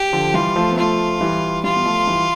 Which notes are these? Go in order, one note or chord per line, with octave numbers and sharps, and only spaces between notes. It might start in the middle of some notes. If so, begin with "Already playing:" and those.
Already playing: G4
D3 F3
E3 G3 F4
F3 A3
B3
F3 A3 F4
E3 G3
E3 G3 F4
B3
F3 A3
E3 G3